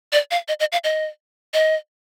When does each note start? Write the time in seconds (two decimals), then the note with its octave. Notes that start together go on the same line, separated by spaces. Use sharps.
0.13 D5
0.31 F5
0.48 D#5
0.60 D#5
0.72 F5
0.84 D#5
1.54 D#5